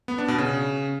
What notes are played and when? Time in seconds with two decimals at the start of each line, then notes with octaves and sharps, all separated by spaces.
0.08 B3
0.18 D4
0.28 B2
0.38 C#3